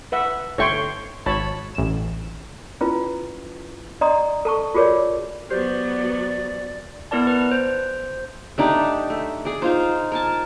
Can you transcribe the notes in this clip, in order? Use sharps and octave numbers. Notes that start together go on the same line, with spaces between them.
B4 E5 F#5
G1 A3 C#5 G5 C6 C#6
G#1 C#5 A5 B5
A1 E7
C#4 E4 F4 B4
D4 D5 D#5 A#5 C6 D#6
A4 A5 C#6
F4 F#4 G#4 A#4 C#5 D5
F#3 B3 G4 C5 D5 G6
B3 E4 A#4 D5 A5
B4
C5
A3 D4 D#4 G4
A3
G#4 D5
D#4 F4 C5
A#4 G#5 A5